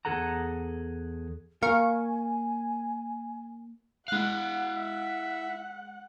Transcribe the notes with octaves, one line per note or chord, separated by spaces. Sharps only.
E2 C3 G#4 A4 F#5 A#5
A#3 A#4 F5 G#5 C#6
G#3 E4 F5 F#5 F#6
E5 F#5